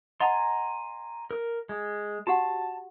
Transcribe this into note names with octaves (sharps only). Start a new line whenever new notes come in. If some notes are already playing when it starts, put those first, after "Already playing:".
D#5 F#5 G#5 A#5 C6
A#4
G#3
F#4 G4 F#5 A5